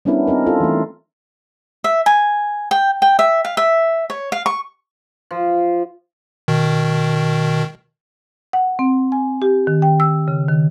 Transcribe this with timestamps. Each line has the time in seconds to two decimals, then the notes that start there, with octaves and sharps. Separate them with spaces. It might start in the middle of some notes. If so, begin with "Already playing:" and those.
0.05 G3 B3 C#4 D4 E4 A#4
0.27 C4 D#4 A#4
0.46 F4 A4
0.60 E3 A3
1.84 E5
2.06 G#5
2.71 G5
3.02 G5
3.19 E5
3.45 F5
3.57 E5
4.10 C#5
4.32 F5
4.46 C#6
5.31 F3
6.48 B2 D#3
8.53 F#5
8.79 C4
9.12 G#5
9.42 G4
9.67 D#3
9.82 G5
10.00 E6
10.28 C#3
10.48 D#3